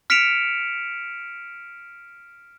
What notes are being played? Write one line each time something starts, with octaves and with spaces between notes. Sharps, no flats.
F6 B6 C#7 D7 E7 F7